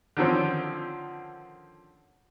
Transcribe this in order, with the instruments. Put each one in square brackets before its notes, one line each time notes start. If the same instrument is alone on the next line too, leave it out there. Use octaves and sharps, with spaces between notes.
[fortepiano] D3 D#3 F3 C4 C#4